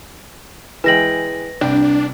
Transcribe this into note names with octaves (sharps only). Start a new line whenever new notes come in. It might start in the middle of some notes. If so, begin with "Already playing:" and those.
E3 G#3 B4 G5 A#6 F#7
C2 D4 G5